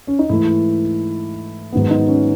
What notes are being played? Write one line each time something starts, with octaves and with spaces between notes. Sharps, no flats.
C#4
D#4
G#2 E3 A3 E4
G#2 D#3 F#3 B3
D#4
C#4